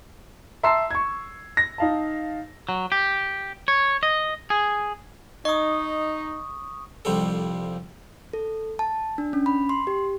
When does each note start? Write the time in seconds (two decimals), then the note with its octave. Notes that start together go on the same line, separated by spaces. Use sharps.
0.63 E5 A5 A#5 C6 E6 C7
0.91 C#6 G#6
1.57 A#6
1.78 D#4 F5 A5
2.69 F#3
2.92 G4
3.68 C#5
4.03 D#5
4.50 G#4
5.45 D#4 D#5 C#6 D#6
7.05 C2 F2 F3 G3 A4
8.33 A4
8.79 A5
9.18 D4
9.33 C#4
9.46 B5
9.69 C6
9.87 G4